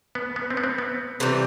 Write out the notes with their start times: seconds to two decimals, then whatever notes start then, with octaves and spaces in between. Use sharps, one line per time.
0.15 B3
0.36 B3
0.50 C4
0.57 B3
0.64 C4
0.78 B3
1.20 C3 E3 G3